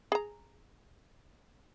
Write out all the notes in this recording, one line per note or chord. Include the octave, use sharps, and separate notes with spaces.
G#4 A#5